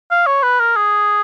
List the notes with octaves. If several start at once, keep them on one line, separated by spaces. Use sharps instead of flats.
F5
C#5
B4
A#4
G#4